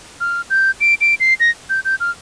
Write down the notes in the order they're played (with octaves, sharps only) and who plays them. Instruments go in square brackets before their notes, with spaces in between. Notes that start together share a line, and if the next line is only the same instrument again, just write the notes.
[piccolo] F6
G6
D7
D7
C7
A#6
G6
G6
F6